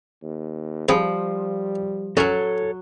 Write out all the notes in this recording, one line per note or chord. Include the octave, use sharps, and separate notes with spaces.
D#2
F3 G3 C4 G#4 B4
F#3 C#4 A4 A#4 C#5